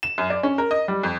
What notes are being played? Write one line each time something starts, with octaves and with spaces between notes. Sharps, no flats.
E7
F#2
D5
C#4
A#4
D#5
G3
F2